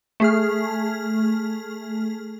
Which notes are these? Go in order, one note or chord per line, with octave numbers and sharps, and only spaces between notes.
A3 G#4 F6